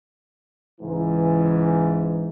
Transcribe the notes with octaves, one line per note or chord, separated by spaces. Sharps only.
C#2 G#2 E3